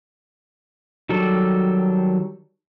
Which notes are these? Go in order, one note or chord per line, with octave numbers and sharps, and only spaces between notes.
D#3 F#3 G3 A4